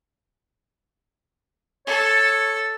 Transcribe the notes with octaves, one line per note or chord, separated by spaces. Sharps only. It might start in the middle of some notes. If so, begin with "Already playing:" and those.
A4 C#5